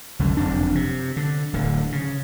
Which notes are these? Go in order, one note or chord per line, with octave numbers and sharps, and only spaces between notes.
C2 F#2 D3
F#1 F2 D4
C3
D3
D1 D3
C#3